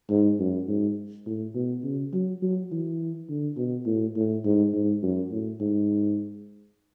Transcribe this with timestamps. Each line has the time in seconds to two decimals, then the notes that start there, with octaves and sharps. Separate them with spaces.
0.10 G#2
0.40 F#2
0.69 G#2
1.26 A2
1.55 B2
1.84 C#3
2.13 F#3
2.42 F#3
2.72 E3
3.29 D3
3.57 B2
3.86 A2
4.16 A2
4.45 G#2
4.73 G#2
5.03 F#2
5.32 A2
5.61 G#2